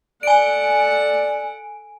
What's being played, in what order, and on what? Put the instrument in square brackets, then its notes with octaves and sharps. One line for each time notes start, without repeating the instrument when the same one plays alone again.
[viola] A4 F#5 [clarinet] D5 [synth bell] G#5 D7